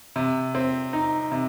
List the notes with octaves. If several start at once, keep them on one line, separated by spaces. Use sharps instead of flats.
C3
C4
D#4
C3